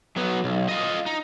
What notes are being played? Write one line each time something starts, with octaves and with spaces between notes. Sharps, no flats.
F#3 B3
B1
F4 D#5
D#4